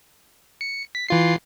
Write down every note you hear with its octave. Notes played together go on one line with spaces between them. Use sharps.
C#7
B6
E3 F4 C7